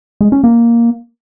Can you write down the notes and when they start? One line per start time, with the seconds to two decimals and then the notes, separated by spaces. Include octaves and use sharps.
0.21 G#3
0.32 C#4
0.44 A#3